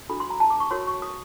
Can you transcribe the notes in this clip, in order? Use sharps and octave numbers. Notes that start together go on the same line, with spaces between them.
D4 F#4 A4 B5
C6
A#5
A5
D6
C#6
F#4 A#4 C#5 C6
C#6
D#6